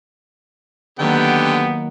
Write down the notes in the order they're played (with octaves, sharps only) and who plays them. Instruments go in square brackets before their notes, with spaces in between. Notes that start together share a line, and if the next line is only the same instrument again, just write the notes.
[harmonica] D3 G4 G5 [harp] D#3 F#3 A#3 [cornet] B3